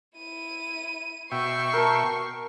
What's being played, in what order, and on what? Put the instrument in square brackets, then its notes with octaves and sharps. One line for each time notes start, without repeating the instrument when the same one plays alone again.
[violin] E4 D#7
[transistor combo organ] B2 E5 G5 [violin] C#6 C7
[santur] A#4 A5